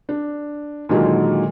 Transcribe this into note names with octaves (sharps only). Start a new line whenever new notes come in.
D4
A#2 D3 D#3 F#3 G#3 A#3